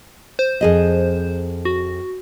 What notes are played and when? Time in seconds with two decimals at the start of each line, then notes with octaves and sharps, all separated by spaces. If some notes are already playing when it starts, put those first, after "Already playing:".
0.39 C5
0.61 F2 G#4 D#5
1.65 F#4